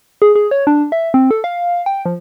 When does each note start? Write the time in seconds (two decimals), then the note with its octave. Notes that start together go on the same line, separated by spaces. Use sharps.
0.22 G#4
0.36 G#4
0.51 C#5
0.67 D4
0.92 E5
1.14 C4
1.31 A4
1.44 F5
1.86 G5
2.05 F3